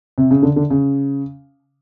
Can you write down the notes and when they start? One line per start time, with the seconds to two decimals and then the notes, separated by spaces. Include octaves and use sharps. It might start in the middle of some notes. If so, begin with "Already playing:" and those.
0.18 C3
0.31 C#3
0.43 D3
0.56 D3
0.70 C#3